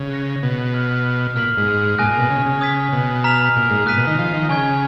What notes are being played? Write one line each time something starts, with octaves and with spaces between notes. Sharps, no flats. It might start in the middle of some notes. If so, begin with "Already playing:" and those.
Already playing: C#3
F#6 A#6 C#7
B2
B5 F6 G#6
A#2 F6 B6 F#7
G#2
A#2 G#5 D#6 F#6 A#6 D#7
A#2
B2
C#3
C#3
D#6 G#6 B6
B2
A#5 F6 B6 F7
A#2
G#2
A#2 D#6 F#6 B6 D#7
B2
D#3
F3
D#3
C#3 G#5 C#6 G#6